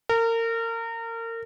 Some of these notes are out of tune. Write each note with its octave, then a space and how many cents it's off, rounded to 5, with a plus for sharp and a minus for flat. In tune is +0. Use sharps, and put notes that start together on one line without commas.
A#4 -30